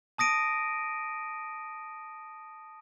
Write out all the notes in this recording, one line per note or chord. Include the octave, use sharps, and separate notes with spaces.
A5 D#6 A#6 D7 D#7